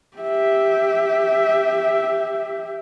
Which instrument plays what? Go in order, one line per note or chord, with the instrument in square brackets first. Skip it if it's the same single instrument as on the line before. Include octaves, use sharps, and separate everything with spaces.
[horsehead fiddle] G4 E5